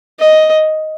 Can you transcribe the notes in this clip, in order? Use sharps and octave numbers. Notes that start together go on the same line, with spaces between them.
D#5